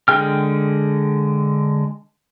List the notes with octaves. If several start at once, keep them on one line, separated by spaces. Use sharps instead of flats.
D3 G#3 G#4 G5 F6